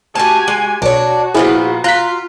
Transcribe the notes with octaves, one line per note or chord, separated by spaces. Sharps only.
A3 F#4 G4 G#5 A5
G#3
B1 D4 F#4 C#5
A#2 F3 B3 E4 G#4
F4 A#5 F#6 B6